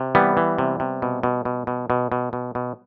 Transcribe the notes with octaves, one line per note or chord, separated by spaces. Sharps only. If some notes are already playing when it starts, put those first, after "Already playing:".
Already playing: C3
E3 G3 B3
E3
C3
C3
B2
B2
B2
B2
B2
B2
B2
B2